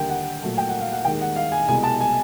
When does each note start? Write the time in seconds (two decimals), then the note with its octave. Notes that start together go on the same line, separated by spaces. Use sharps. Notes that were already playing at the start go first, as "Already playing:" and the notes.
Already playing: D#2 D3 G3 A#3 G5
0.10 F#5
0.42 A#2 F#3 A3
0.58 G5
0.69 F#5
0.80 F5
0.92 F#5
1.05 D#2 D#3 G#3 G5
1.21 F#5
1.36 F5
1.52 G#5
1.68 C2 B2 G#3 G#5
1.83 A5
2.00 G#5